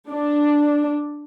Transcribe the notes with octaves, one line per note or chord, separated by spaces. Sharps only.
D4